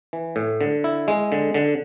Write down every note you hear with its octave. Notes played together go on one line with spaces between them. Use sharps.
E3
A2
D3
E4
G#3
D3
D3